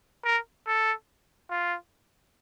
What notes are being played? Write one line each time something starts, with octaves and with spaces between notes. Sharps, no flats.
A#4
A4
F4